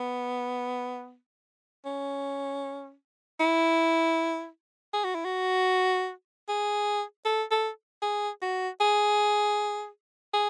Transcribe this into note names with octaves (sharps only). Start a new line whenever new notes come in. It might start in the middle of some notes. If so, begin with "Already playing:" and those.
Already playing: B3
C#4
E4
G#4
F#4
E4
F#4
G#4
A4
A4
G#4
F#4
G#4
G#4